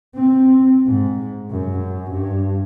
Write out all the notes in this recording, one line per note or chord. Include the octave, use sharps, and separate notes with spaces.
C4
G#2
F#2
G2